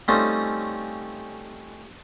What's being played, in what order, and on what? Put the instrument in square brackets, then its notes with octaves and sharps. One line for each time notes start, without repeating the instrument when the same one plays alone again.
[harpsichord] G3 A3 C4 C#4 D#4 F4